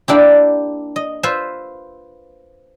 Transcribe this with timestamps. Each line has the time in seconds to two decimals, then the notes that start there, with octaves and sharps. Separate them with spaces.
0.08 A#3 D4 E4 G4
0.96 D#5
1.23 F4 B4 C5 E5